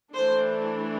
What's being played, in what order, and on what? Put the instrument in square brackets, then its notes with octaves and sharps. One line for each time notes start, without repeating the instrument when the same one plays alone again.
[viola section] E3 A3 D4 C5